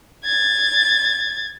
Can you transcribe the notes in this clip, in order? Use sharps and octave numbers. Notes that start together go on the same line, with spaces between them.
G#6 A6